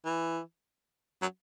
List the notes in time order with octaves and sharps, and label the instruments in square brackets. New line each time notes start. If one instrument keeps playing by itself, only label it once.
[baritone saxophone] E3
F#3